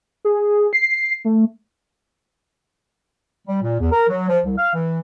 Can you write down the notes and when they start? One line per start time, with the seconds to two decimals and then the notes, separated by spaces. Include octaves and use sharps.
0.25 G#4
0.73 C7
1.25 A3
3.48 G3
3.62 A#2
3.80 E2
3.92 A#4
4.08 F#3
4.29 F3
4.45 C2
4.57 F5
4.74 E3